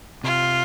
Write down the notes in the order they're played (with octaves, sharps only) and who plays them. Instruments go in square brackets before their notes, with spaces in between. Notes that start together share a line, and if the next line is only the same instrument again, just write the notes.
[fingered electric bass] C3 [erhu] F4